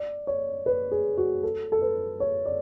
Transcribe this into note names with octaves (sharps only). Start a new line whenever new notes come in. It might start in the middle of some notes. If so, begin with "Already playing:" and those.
Already playing: D5
C#5
B4
G#4
F#4
A4
A4
B4
C#5
D5